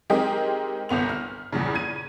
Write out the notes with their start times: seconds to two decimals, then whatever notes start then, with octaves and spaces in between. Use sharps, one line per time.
0.10 G#3 C4 D#4 G4 G#4 A#4
0.89 G1 C2 B3 F7
1.09 F6
1.53 E2 G2 A#2 C#3
1.75 G#6 D#7